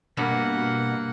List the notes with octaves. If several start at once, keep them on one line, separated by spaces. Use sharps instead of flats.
G2 B2 A#3 F#5